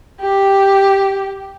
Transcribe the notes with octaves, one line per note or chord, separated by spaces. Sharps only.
G4